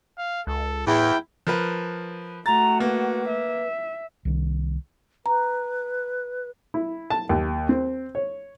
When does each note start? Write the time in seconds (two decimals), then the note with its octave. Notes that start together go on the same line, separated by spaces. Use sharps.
0.18 F5
0.47 C#2 A4
0.87 E2 A2 E4 G5
1.47 F3 A#4 B4
2.46 A3 F#4 A#5 A6
2.80 A#3 B4
3.28 E5
4.25 C2 D#3
5.26 B4 A#5
6.74 E4
7.10 A5
7.29 D#2
7.69 C4
8.15 C#5